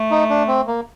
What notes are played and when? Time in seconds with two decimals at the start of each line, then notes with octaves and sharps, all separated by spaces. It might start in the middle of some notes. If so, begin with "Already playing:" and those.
Already playing: A3
0.11 D#4
0.30 D4
0.48 C4
0.67 A#3